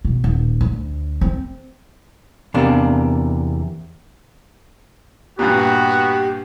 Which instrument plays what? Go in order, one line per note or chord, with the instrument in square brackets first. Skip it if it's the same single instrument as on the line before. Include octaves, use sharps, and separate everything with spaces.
[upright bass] B2
D#1
D2
C4
[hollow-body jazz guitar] E2 C3 A#3 D4
[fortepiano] G2 A#2 [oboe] B3 [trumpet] F#4 [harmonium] G4